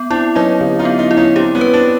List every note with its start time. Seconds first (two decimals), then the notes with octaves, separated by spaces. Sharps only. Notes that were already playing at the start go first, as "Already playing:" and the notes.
Already playing: B3
0.10 C4 D4 E4
0.35 F#3 C#4 D#4
0.61 D3
0.79 D#4 F4
0.85 B3
0.98 D#4 F4
1.11 E4
1.17 C#4 D#4
1.35 C4 D4 G4
1.55 B3 C#4
1.61 B4
1.74 C4 D4